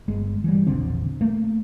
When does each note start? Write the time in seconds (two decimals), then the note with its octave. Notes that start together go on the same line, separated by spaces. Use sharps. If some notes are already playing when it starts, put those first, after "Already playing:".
0.08 G1 G#3
0.44 E3 G3
0.67 E1 A#1 D3 C4
1.21 A3 A#3